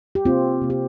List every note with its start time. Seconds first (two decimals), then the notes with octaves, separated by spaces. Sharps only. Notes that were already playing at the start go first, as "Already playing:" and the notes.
0.15 G4
0.25 C3 A#3 C4 F4
0.62 C3 A#3
0.70 G4